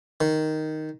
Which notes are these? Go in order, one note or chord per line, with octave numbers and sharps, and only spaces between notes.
D#3